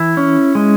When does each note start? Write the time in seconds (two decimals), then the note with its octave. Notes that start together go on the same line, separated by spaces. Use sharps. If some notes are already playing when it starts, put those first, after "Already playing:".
Already playing: E3 E4
0.17 C#4
0.55 G#3